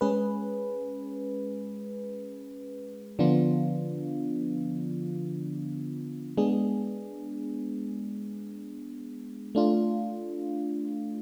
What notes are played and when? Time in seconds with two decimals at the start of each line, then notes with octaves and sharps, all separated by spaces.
0.01 G#3 C#4 G#4 B4
3.19 D3 F3 B3 D4 F4
6.37 G#3 B3 D4 G#4
9.55 A3 D4 F4